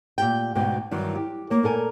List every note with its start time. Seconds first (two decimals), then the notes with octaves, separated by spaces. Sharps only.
0.18 A#2 G4 G5
0.55 D2 G#2 B2 G5
0.91 G2 D#3 E3 F#3
1.15 G4
1.50 A#3 C#5
1.63 A#2 A4 A#4 G#5